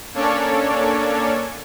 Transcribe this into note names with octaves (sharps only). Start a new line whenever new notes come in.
A#3 C#4 D4 A4 C#5 D5